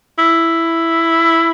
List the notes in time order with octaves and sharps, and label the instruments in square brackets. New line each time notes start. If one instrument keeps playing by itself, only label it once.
[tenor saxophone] E4